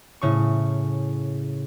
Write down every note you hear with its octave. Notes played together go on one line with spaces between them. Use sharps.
A2 C#3 C#6